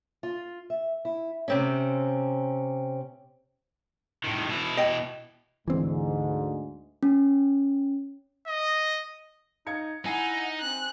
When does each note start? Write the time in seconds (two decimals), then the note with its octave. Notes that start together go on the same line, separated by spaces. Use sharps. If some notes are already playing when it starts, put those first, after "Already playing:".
0.23 F4
0.70 E5
1.05 E4
1.48 C3 C4 C#4
4.24 A2 D#3
4.48 B2 E4
4.77 D#5 G5
5.68 D2 G#2 E3 C4
7.03 C#4
8.47 D#5
9.67 D#4 F5 G#6 C#7
10.05 D#4 E4 F#5 G#5 C7
10.60 C4 F#6